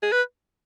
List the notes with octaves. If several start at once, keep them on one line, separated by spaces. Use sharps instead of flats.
G#4
B4